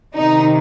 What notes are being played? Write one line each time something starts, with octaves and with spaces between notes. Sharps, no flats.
C3 D#3 D#4